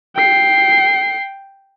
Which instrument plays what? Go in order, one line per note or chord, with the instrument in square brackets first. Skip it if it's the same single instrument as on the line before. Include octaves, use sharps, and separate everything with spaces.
[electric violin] G5 C7